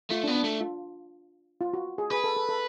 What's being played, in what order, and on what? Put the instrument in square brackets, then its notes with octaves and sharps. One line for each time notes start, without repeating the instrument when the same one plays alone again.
[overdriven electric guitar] A3 [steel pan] F4
[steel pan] D4
[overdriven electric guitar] B3
[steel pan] D4
[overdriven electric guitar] A3
[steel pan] F4
F4
F#4
G#4
[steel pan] G#4 [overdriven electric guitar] B4
[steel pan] A4
A4
A4